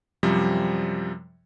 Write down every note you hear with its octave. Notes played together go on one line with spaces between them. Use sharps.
F#2 C3 F3 G3